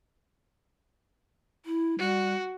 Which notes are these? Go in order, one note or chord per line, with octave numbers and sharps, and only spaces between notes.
E4
G3 F#4